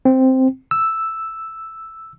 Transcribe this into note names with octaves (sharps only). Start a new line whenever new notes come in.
C4
E6